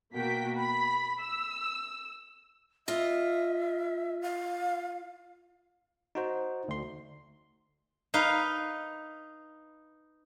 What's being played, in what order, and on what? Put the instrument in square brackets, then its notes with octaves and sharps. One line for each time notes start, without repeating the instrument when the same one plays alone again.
[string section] B2 A#3 F#4 G5 B6
B5 B6
E6
[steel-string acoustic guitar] F4 D#5 [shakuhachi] E5
[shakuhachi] F5
[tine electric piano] D#4 F#4 C5
D2 C6
[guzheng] D#4 B4 F5